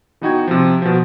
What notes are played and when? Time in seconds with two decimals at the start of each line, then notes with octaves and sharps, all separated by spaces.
0.21 E3 B3 D#4 F#4 G5 G#6
0.48 C3 F3
0.82 B2 F3